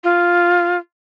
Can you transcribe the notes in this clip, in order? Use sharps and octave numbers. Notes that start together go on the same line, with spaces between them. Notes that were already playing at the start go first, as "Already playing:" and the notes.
F4